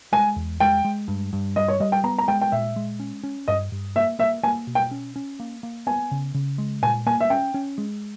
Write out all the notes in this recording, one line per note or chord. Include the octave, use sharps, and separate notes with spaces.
G#3 G#5
E2
G#3 G5
G#3
G2
G2
G3 D#5
C#5
G3 D#5
G5
B3 A#5
A#5
G#3 G5
G5
A#2 E5
G#3
C#4
C#4
G2 D#5
G2
A#3 E5
A#3 E5
A#3 G#5
B2
G5
C#4
C#4
A#3
A#3
B3 G#5
C#3
C#3
G#3
A#2 G#5
A#3 G#5
E5
C#4 G5
C#4
G#3